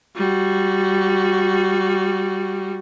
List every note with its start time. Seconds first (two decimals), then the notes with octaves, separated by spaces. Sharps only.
0.15 G3 F#4